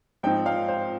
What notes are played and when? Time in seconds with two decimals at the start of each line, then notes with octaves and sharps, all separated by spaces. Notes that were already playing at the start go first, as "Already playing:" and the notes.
0.23 G#2 F3 C4 D#4 G5
0.46 F5
0.68 C5